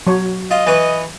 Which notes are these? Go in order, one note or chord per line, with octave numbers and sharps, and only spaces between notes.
F#3 C#5
F4 D#5
E3 B4 C#6